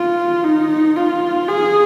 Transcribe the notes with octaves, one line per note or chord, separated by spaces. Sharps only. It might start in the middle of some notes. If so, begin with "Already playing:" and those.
Already playing: F4
D#4
F4
G#4